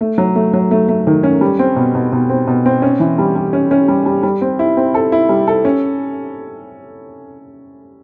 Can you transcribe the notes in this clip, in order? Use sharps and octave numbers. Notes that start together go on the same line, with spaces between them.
A3
F#3
A3
F#3
A3
A3
D#3
C#4
G3
C4
B2
B2
B2
C4
B2
C4
C#4
E3
G3
G3
C#4
C#4
G3
G3
G3
C4
E4
C4
A4
E4
G3
A4
C#4